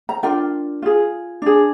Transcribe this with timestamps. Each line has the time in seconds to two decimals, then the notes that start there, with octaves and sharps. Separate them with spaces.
0.09 A#5
0.23 D4 F4 A#4 G5
0.82 F4 G#4
1.42 D4 G#4